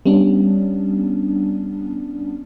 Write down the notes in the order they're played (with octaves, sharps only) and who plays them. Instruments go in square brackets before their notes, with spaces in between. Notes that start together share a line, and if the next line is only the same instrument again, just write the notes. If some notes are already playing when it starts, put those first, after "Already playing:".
[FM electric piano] G3 B3 C#4 D4